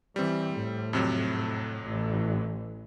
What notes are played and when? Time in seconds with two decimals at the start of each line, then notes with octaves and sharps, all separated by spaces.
0.16 E3 G3 C4
0.52 A2
0.93 F2 C3 F#3
1.86 A1 E3